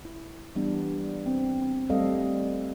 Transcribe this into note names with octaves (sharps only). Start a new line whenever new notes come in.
E4
E3 G3 B3 D4
C4
G3 A3 C4 A4 D#5 F5